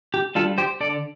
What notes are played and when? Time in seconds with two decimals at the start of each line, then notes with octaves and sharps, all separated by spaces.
0.14 G4
0.35 G3 D4 F4 A4
0.58 G4 C5
0.80 D3 A4 D5